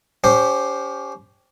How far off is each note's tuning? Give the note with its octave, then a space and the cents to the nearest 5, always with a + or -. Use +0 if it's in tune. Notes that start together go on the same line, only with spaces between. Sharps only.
C#4 +35 G4 +10 C5 +0